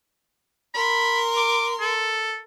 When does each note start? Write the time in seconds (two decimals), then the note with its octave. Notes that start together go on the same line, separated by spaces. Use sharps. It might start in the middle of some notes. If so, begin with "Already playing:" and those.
0.74 A#4 B5 C6
1.37 D6
1.80 A4